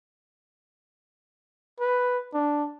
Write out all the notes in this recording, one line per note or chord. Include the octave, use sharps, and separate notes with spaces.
B4
D4